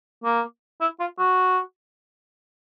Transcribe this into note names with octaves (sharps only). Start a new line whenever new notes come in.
A#3
E4
F4
F#4